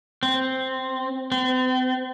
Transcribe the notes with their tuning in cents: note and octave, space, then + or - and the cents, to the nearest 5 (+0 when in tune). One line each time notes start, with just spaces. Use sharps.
C4 +0
C4 -40